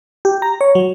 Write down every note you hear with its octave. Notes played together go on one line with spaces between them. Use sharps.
G4
A#5
C#5
F#3